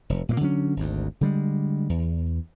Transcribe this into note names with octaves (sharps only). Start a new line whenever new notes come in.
F1
A#2 G#3 A#3
D3 F#3 C4 C#4
G#1 D2
D3 G3 G#3
E2